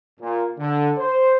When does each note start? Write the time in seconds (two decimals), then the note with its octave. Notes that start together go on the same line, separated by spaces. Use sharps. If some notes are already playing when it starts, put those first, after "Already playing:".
0.20 A#2
0.58 D3
0.98 C5